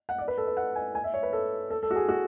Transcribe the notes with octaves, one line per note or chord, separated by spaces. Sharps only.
F#5
D5
B4
A4
B4
F#5
G#5
G#5
E5
C#5
B4
A4
A4
A4
F#4
G#4
F#4